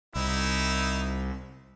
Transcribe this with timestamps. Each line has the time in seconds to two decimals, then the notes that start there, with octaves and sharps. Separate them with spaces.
0.15 C2 D#4 E4